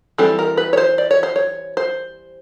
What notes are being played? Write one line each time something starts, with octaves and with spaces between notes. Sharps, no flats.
E3 G3 C4 A4
A#4
B4
C#5
C5
D5
C#5
C5
C#5
C5